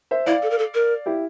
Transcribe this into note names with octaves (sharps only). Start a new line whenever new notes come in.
C5 E5
E4 D5 F5
A4
A#4
A4
A#4
E4 G4